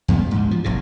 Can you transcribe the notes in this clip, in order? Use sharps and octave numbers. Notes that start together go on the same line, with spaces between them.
E2 A#2 G3 B3
D2 G#2
F3
F1 B1 A2 C3